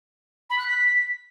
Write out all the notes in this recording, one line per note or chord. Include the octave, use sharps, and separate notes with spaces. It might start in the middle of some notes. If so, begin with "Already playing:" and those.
B5
F#6
B6